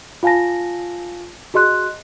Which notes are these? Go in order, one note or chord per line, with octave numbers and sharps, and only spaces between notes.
F4 F5 G#5 A5 A#6
F#4 G#4 D#5 C6 F#6